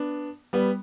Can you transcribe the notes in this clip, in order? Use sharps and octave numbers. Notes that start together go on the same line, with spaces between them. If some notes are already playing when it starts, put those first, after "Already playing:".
Already playing: B3 D4
G3 B3